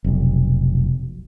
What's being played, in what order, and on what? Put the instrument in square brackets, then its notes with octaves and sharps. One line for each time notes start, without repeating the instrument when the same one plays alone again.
[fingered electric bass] F1 B1